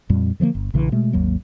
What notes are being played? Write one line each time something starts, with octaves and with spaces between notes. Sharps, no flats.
F2 A#2 G3
D3 F3 G3 A#3
G1
A#1 C#3 E3
B2 G#3 A3
G#1 D#2 F#3 A#3